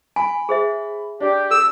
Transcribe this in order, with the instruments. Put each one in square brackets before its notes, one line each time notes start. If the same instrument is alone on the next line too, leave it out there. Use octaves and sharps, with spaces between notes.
[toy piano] G#5 [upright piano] B5
[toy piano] G#4 C5 E5
[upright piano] D4 [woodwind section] G4
[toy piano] A4 [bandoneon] E6